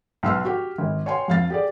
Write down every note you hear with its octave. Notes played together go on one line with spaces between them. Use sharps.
B1 C6 E6 F6
F#4 G4
G#1
C#5 G5 G#5 C6
F2 F5 A6
G4 G#4 D5